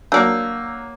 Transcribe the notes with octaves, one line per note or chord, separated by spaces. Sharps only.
F#3 A#3 D4 D5 E6 G6